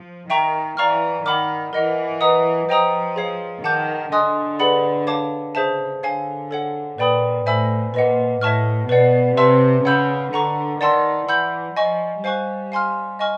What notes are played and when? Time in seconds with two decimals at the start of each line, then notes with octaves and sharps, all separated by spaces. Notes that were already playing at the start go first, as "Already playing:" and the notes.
Already playing: F3
0.30 D#3 E5 G5 A#5 C#6
0.77 E3 D5 F5 A#5 C#6 F6
1.25 D#3 F#5 B5 D6 F6
1.73 E3 A#4 D#5 F#5
2.21 B4 D#5 F#5 A#5 D#6
2.69 F3 C5 D#5 G5 A#5 D#6
3.16 G#4 C#5 F5
3.64 D#3 F#5 A5 D6 G6
4.12 D3 D#5 G#5 C6 D#6 F#6
4.59 G#4 B4 D5 F#5 B5
5.07 C#5 F5 A5 D6
5.55 C#3 G#4 C5 E5 A5
6.03 D3 C#5 F5 G#5
6.51 A4 C#5 F#5
6.98 A#2 B4 D5 G5 B5 D#6
7.46 A2 C5 E5 G#5 B5 E6
7.94 A#2 B4 D#5 F#5
8.41 A2 C#5 E5 A5 C#6 F6
8.89 B2 B4 D5 F#5
9.37 C3 B4 E5 A5 C6 E6
9.85 C#3 C#5 F#5 B5 E6 G6
10.33 D3 F#5 A#5 C#6
10.80 D#3 D5 F#5 A5 C6 E6
11.28 E3 F#5 B5 E6 G6
11.76 F3 D#5 G#5 C#6
12.23 G3 C5 F5 G#5 C#6 F#6
12.72 F5 G#5 C6 F6
13.19 D#5 G#5 C#6 F6